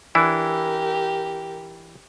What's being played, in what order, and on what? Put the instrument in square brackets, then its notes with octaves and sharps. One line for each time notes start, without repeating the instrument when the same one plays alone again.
[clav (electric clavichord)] E3 D4 E4 [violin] G4 A#4